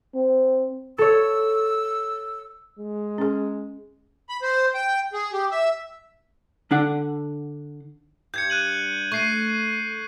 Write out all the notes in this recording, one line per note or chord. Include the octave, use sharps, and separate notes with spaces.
C4
A4 C#5 E6
G#3
C#4 G#4
B5
C5
G5
G#4
G4
E5
D3 D4 F#5
G2 G6 G#6 C#7
F#6 D#7 F#7
A3 C#6 C7 D#7